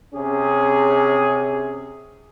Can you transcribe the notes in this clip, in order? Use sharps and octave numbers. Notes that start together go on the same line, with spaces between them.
C3 C#4 G#4